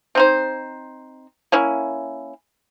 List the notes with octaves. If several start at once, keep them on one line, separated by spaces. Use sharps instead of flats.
C4 D#4 C5
A#3 C#4 E4